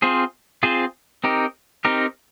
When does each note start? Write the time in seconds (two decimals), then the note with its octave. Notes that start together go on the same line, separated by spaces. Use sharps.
0.02 C4 F4 G#4 C5
0.63 C4 F4 G#4 C5
1.24 C4 D#4 G4 A#4
1.85 C4 D#4 G4 A#4